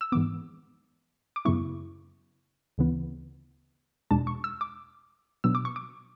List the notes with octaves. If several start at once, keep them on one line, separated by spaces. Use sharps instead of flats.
E6
G#2 E3 B3 D6
D6
F#2 C#3 F#3 B3 E4 C#6
D2 C#3 E3 B3
E2 B2 G#3 D4 A5
C#6
E6
D6
B2 F#3 B3 D4 E6
D6
C#6
D6